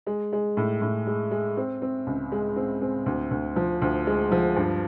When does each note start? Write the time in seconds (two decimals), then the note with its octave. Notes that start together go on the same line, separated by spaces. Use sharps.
0.07 G#3
0.33 G#3
0.57 A2
0.82 A2
1.07 G#3
1.31 G#3
1.57 C4
1.82 C4
2.07 C#2
2.32 G#3
2.56 C4
2.82 C4
3.06 D2
3.31 D2
3.56 F3
3.82 D2
4.07 G#3
4.32 F3
4.56 G2